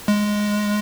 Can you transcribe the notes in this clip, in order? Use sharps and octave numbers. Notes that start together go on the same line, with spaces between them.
G#3